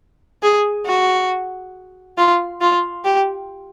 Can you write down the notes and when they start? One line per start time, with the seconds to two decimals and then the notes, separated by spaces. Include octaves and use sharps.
0.43 G#4
0.86 F#4
2.17 F4
2.61 F4
3.04 G4